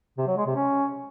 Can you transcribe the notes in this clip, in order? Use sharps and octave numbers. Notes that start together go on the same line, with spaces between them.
C3
F#3
G#3
C3
C#4